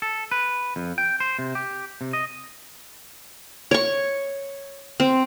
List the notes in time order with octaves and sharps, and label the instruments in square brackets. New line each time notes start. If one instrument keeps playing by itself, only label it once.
[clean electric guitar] A4
B4
F2
G5
C5
C3
G4
C3
D#5
[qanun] C#5 C#6
C4